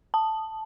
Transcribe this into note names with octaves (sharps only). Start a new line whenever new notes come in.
A5